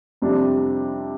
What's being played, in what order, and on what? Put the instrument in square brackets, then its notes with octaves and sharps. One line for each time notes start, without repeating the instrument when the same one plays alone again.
[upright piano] F2 C3 G3 D4